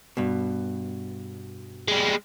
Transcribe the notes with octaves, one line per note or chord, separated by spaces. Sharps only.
G2 B2
G3 G#3